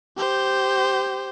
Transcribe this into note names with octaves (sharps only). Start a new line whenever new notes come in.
G4 C5